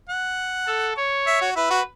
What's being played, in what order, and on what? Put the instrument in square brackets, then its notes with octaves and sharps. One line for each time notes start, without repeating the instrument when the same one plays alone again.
[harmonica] F#5
[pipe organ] A4
C#5
[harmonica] E5
F#4
[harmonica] E4 [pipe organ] B4
[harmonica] F#4